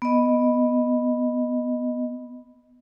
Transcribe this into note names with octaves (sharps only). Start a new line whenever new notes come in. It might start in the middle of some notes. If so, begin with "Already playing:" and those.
B3 D#5